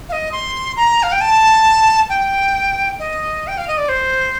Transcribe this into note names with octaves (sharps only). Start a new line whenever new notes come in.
F5
D#5
C6
A#5
F5
G5
A5
G5
D#5
G5
F5
D#5
D5
C5